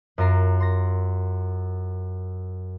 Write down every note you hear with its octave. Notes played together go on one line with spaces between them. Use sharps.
F#2 F4 A#4 A#5 C7
C6 A#6